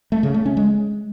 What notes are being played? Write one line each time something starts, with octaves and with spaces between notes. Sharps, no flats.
A3
C#3
A3
C#4
G#3